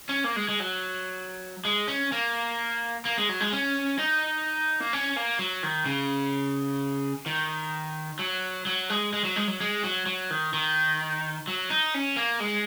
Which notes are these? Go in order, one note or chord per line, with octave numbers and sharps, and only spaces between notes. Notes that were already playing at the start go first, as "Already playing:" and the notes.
C#4
A#3
G#3
G#3
F#3
G#3
C#4
A#3
A#3
G#3
F#3
G#3
C#4
D#4
A#3
C#4
A#3
F#3
D#3
C#3
D#3
F#3
F#3
G#3
G#3
F#3
G#3
F#3
G#3
F#3
F#3
D#3
D#3
F#3
D#4
C#4
A#3
G#3